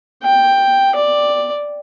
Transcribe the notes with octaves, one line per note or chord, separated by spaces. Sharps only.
G5
D5